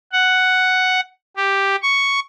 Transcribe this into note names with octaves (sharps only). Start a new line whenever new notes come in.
F#5
G4
C#6